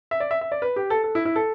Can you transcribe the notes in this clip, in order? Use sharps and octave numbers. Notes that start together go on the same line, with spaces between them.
E5
D5
E5
E5
D5
B4
G4
A4
A4
E4
E4
A4